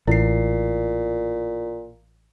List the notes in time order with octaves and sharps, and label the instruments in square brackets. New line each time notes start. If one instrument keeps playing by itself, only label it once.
[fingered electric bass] A1 [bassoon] A#2 [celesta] E4 C7